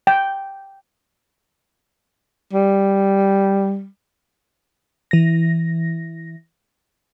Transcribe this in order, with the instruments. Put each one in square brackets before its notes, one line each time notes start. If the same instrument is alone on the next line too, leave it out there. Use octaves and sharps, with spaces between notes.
[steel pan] G5
[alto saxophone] G3
[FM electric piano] E3 A#6